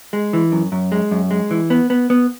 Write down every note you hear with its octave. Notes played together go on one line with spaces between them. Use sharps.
G#3
E3
F#2
F#2
G#3
F#2
G#3
E3
B3
B3
B3